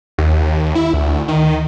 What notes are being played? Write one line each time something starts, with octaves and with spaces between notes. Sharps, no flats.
D#2
E4
D2
D#3